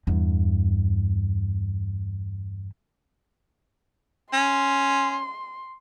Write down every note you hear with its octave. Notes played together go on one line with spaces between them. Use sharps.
E2 G2
C#4 C6